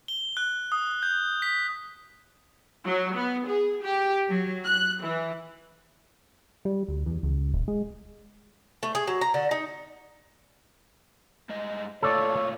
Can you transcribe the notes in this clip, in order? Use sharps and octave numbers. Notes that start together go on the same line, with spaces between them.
G7
F#6
D#6
G6
B6
F#3
B3
G#4
G4
F#3
F#6
E3
G3
D2
E2
C#2
D#1
G#3
A3
G#4
F#3
A#5
D3
D#4
G2 G#3 D#5
A#2 A3 F4 A4 C#5 D5